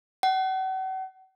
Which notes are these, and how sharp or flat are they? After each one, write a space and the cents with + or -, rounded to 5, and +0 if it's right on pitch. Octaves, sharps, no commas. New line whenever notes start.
F#5 +40